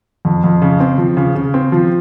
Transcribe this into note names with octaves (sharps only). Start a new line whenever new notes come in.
F2
F2
C#3
C4
F3
C#3
C#3
C4
F3